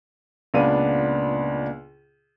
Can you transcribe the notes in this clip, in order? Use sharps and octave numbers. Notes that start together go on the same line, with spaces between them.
C#2 A#2 B3 D4 F5 D#7